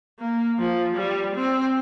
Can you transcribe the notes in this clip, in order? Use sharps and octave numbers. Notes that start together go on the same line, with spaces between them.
A#3
F3
G3
C4